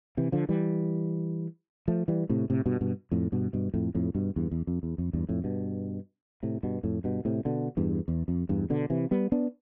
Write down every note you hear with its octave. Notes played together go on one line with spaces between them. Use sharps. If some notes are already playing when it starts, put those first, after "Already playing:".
C3 E3
D3 F3
E3 G3
F3 A3
E3 G3
A2 C3
A2 C3
G2 B2
G2 B2
F2 A2
G2 B2
G2 B2
F2 A2
F2 A2
G2 B2
E2 G2
E2
F2
E2
F2
E2 G2
F2 A2
G2 B2
A2 C3
G2 B2
F2 A2
G2 B2
A2 C3
B2 D3
E2 G2
E2
F2
E2 G2
B2 D3
C3 E3
G3 B3
B3 D4